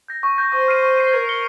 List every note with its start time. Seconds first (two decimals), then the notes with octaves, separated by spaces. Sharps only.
0.08 G6 A#6
0.23 C#6
0.38 G6 A#6
0.52 C5 C#6
0.68 F6 C7 D#7
0.82 C#6
0.98 F6 C7 D#7
1.12 A#4 G#6
1.28 C#7 G7